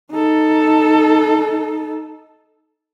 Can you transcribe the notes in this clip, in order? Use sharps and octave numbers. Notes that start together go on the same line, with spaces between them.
D#4 A4